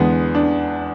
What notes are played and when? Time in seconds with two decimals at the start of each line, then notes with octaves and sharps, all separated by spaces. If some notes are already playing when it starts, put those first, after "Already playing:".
Already playing: E2 D3 G#3 B3
0.35 D4